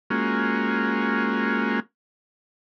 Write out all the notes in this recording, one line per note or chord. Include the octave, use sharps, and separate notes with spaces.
G#3 A#3 C#4 F4 F#4